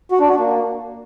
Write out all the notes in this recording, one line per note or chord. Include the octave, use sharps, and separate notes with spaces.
F#4
D4
F#4
A#3